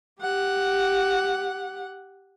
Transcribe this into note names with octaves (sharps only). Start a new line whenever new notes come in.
G4 F#5